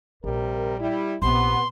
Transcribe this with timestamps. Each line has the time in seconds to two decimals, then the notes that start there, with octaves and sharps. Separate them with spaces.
0.24 A#1 C3 G3 A#4
0.79 G3 E4
1.22 A#1 C3 B3 C6